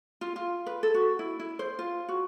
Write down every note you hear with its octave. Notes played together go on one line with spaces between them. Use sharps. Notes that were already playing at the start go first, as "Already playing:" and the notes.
F4
F4
B4
A4
F#4
E4
E4
C5
F4
F#4